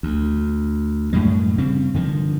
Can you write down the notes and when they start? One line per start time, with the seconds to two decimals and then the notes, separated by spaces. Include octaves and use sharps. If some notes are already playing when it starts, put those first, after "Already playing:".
0.03 D2
1.13 F#2 A2 G3 G#3
1.58 C#3 G3 C4
1.94 G2 D3 D#3 F3